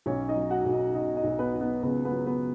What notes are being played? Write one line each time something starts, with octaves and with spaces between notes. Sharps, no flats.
B1 C#4 C#5
D#4 D#5
F#3
F#4 F#5
B1
D#4 D#5
B2 D#4 D#5
D#4 D#5
B1
B3 B4
F#3
B3 B4
C#2 B3 B4
B3 B4
F#3
B3 B4